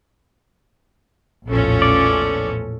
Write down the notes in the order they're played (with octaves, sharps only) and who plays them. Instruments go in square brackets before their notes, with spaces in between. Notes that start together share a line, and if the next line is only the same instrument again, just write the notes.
[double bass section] A#1 E2 A2 [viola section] F3 C#4 A4
[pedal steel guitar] D5